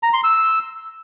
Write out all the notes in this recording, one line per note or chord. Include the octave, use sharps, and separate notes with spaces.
A#5
C6
E6